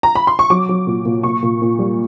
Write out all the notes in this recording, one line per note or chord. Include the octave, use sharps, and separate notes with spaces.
A#5
B5
C6
C#6
F#3 D6
F#3
A#2
A#2
A#2 C#6
A#2
A#2
G3